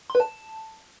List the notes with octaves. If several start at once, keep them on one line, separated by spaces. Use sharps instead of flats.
C6
B4
A5